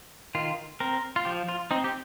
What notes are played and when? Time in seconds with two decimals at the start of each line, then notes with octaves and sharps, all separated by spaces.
0.35 D#3 F4
0.80 C4 A#4
1.16 F4
1.25 F3 G4
1.49 F4
1.71 C4 D#4
1.84 G4